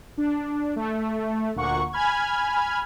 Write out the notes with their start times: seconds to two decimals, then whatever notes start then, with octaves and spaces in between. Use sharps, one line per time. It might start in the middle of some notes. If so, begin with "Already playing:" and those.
0.17 D4
0.76 A3
1.55 D2 A#2 A#3 F#5 C#6
1.93 G#5 B5 F6 G#6